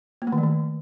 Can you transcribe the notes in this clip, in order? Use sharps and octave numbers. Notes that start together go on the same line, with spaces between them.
A#3
A3
D#3
F3
D#3